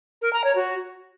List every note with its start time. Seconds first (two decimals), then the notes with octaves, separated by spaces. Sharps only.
0.22 A#4
0.33 A#5
0.44 C#5
0.55 F#4